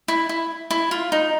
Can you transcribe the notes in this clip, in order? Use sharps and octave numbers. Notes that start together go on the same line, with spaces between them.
E4
E4
E4
F4
D#4